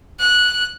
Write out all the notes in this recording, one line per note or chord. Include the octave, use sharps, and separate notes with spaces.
F#6